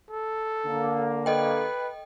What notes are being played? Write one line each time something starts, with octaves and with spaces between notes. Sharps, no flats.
A4
D3 A#3
A4 B4 D#5 G5